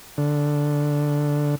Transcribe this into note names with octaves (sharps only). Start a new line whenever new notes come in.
D3